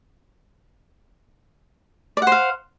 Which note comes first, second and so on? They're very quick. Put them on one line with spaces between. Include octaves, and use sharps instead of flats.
D5 F#5 C5 F5